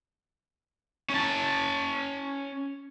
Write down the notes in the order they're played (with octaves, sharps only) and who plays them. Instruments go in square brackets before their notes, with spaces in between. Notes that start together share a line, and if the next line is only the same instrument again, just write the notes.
[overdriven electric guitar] C#4 A5